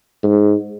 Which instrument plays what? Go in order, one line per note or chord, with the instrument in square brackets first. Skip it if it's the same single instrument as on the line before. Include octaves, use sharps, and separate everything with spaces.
[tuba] G#2